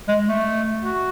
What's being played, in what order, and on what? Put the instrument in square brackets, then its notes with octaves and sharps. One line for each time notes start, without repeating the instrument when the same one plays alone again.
[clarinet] G#3
A3
[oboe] F#4